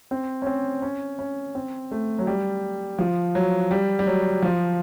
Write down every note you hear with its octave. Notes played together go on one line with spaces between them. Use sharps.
C4
C#4
C4
C#4
C#4
C4
A3
F#3
G3
F3
F#3
G3
G3
F#3
F3